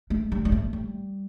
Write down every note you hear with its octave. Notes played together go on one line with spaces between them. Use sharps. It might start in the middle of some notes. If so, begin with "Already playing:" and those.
A3
G3
G3
A3
G3